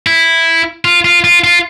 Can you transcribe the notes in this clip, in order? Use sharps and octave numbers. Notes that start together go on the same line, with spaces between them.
E4
F4
F4
F4
F4